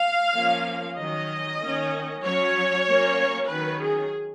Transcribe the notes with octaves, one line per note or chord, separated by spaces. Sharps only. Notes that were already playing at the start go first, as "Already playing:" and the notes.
Already playing: F5
F3 A#3 C#4
D#3 F#3 C#4 D#5
D#3 A#3 C#4
F#3 C#4 C#5
F#3 A#3 C#4
D#3 F#3 C#4 B4
G#4